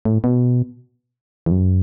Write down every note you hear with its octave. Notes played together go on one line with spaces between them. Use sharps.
A2
B2
E2
F#2